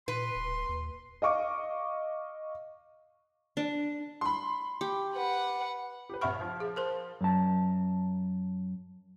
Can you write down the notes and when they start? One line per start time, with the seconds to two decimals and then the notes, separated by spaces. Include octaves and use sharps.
0.08 A#2 B4 C6
0.36 D1
0.69 D#2
1.22 D#5 F5 C#6 D6
3.57 D4
4.21 B5 C6
4.81 G4
5.14 B4 F#5
6.10 G4 B4
6.21 A#1 E5 F#5 B5 C#6 F6
6.41 F3
6.60 G#4
6.76 A#4 C5 C6
7.21 F#2 A5